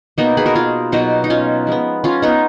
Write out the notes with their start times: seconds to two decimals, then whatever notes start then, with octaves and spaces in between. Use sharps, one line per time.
0.18 B2 A#3 B3 D#4
0.37 G#4 B4
0.46 F#4 A#4
0.56 F4 G#4
0.92 B2 F#3 A#3 D#4 F#4
1.24 D#4
1.30 C#4 F4
1.67 F3 G#3 B3
2.04 C#4 F4
2.22 B3 D#4